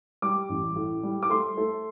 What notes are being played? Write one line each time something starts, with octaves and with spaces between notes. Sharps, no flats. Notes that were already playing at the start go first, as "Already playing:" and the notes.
G3 D6
A1
A2
G3
D6
A3 C6
A3